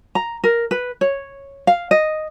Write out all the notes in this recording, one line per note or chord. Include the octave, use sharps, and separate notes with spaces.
A#5
A#4
B4
C#5
F5
D#5